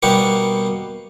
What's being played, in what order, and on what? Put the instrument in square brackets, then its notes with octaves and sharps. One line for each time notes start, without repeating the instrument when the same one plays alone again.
[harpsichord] B2 G3 A#3 B3 G4 C#6